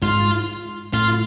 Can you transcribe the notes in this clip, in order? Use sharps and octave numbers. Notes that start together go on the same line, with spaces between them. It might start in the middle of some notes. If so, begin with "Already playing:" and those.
G#2 F4
A2 F4